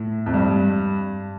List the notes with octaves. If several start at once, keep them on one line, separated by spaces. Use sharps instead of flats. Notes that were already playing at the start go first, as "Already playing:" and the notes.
Already playing: A2
F2
G2